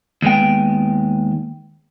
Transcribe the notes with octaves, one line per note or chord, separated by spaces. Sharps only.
D#2 G#3 B3 G5